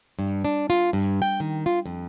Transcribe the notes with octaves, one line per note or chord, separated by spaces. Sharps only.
G2
D4
F4
G2
G5
D#3
F4
F2